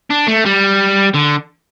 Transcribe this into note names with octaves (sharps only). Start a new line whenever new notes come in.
D4
A3
G3
D3